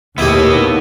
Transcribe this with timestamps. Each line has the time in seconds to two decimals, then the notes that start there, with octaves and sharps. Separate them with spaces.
0.18 D#2 A2 D#3 B3 E4 G4 D#5